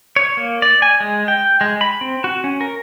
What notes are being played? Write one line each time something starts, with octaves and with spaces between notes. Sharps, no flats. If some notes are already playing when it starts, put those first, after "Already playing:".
C#5
A#3
D5
G#5
G#3
G5
G#3
B5
C4
F#4
C#4
A#4